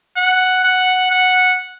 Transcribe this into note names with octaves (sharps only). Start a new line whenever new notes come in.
F#5
F#5
F#5